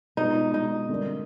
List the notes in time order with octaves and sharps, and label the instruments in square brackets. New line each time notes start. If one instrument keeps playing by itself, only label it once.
[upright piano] B2 G#3 B3 D4 F4 [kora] D#4
[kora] D#4
[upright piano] D3 G3 A#3 D4